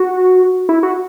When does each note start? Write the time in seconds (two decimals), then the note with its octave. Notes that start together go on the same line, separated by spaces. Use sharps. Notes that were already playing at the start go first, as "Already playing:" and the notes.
Already playing: F#4
0.69 E4
0.83 F#4